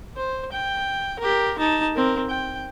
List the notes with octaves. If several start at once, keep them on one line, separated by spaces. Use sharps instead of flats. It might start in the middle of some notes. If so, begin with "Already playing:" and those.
C5
G5
G4 A#4
D#4 A5
C4 A#4
G5